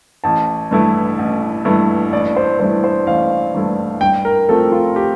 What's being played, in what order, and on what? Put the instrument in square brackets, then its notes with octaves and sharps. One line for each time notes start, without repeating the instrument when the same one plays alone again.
[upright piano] A1 [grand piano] A5
[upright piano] G2 E3 A3 E4
A1
G2 E3 A3 E4
[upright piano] A1 [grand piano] D5
[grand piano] C5
[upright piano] G2 E3 A3 E4 [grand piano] C5
[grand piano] C5
[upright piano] A1 [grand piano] F5
[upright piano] G2 E3 A3 E4
[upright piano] G2 [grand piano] G5
[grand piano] A#4
[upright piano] F3 A3 C4 [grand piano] A4
[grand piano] F4
G4